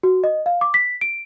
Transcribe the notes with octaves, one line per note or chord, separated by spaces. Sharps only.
F#4
D#5
F5
D6
B6
D7